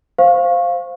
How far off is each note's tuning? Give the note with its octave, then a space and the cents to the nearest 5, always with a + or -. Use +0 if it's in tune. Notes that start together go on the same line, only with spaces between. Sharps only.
C5 +0 F5 +0 C#6 -20